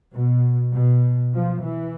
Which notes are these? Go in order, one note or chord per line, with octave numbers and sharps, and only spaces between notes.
B2
B2
F3
E3